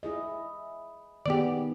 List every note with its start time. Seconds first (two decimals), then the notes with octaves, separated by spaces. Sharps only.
0.03 E4 G#4 D#5
1.26 D#3 B3 G4 G#4 D5